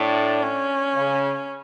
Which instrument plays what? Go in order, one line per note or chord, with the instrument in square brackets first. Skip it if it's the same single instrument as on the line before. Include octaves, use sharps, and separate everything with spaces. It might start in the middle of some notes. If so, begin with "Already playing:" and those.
Already playing: [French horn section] A2 [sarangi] D4
[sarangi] C#4
[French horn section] C#3